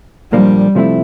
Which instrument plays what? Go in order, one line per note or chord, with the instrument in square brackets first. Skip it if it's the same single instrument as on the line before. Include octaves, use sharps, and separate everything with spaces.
[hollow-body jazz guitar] A#2 F3 A#3 D4 [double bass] G3
[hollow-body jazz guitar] C3 F3 A3 C4 E4